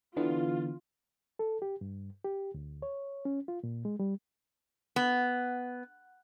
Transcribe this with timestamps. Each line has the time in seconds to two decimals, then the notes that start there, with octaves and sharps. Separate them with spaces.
0.17 D3 E3 B3 F4
1.39 A4
1.62 G4
1.81 G2
2.25 G4
2.54 D2
2.82 C#5
3.25 C#4
3.48 F4
3.63 A#2
3.85 G#3
4.00 G3
4.96 B3